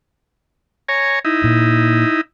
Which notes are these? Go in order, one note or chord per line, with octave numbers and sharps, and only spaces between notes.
C#5 G#5 A#5
D#4 E4
A#2